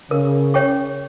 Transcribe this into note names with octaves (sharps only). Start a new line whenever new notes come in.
C#3 A#4
C#5 G5 C#6